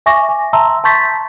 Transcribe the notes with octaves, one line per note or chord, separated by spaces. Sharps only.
E5 G#5 C#6 D6 A#6
G#5
E5 A5 A#5 C6 E6
A5 C6 C#6 G6 A6 B6